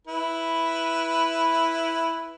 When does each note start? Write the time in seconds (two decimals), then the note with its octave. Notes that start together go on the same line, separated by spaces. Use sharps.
0.07 E4 B4